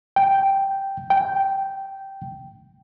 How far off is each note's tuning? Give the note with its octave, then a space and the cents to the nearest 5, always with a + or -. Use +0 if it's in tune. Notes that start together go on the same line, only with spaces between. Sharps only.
G5 -5
G5 -10